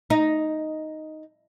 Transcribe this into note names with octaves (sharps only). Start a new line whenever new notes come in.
D#4